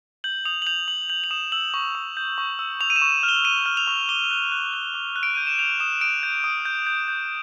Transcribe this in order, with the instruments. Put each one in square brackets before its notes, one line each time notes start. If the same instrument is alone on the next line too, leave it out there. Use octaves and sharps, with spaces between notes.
[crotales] G6 F#7
D#6 F7
F#7
G6 F7
D#6 F#7
G6 F#7
F7
D#6 E7
E6 F#7
C#6
C#6
G6
C#6
E6
C#6 F7
D#7
E7
C#6
F6
G7
F6 D#7
F6
F7
C#6
D6 G7
F#6
F#6
F#6
D6
F#6
D7
G6 D#7
E7
G6 F7
D#6 E7
D#6 D7
G6
D#6
G6
G6
G6